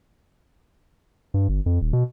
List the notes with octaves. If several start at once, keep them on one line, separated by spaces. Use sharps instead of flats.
G2
G1
F2
D#1
B2